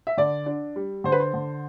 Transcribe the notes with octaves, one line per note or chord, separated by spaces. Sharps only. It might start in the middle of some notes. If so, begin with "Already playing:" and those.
E5
D3 D5
D4
G3
D3 C5
B4
C5
D3